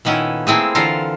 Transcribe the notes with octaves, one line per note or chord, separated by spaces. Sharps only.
A#2 D#3 B3 C#4 E4 A4
A3 A#3 C4 E4 G#4
D3 E3 F4 A4 A#4 F5